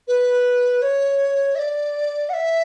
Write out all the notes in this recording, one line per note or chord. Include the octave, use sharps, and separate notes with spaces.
B4
C#5
E5
D5
F#5
E5